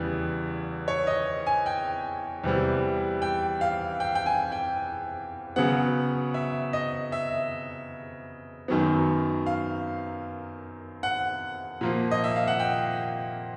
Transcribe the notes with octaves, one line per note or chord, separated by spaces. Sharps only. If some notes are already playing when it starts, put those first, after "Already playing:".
Already playing: E2 C#3 E3 G3
C#5
D#5
G#5
G5
E2 C3 E3 G3
G5
F5
G5
G5
G#5
G5
C#3 F#3 B3 F#5
E5
D#5
E5
F#2 D#3 F#3 B3
F5
F#5
A#2 F3 A#3
D#5
E5
F5
F#5
G5